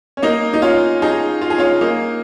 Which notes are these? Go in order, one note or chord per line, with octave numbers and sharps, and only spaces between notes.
C#4
A#3 D#4
D#4
C#4 F4
D#4 G#4
F4
G#4
C#4 F4
A#3 D#4